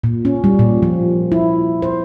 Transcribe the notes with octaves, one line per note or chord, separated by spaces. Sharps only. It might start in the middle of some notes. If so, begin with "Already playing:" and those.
A#2
C#4
G3
A#2
F3
E4
C5